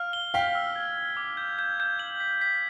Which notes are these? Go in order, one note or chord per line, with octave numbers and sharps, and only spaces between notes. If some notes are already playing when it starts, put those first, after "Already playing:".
Already playing: F5 F6
G7
F5 G5 B6
E6
G#6
G#6
D6
G6
G6
G6
F#7
B6
B6